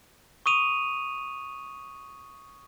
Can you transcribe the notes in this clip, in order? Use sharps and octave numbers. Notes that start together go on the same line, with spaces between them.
C#6 D#6 D#7 F7